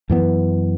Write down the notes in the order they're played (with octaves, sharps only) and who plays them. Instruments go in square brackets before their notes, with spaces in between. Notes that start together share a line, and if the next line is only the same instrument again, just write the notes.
[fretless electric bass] F#2 E3 B3